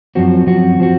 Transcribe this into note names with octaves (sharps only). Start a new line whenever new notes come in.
F#2 F3 C4 F#4
F#2 F3 C4 F#4
F3 C4 F#4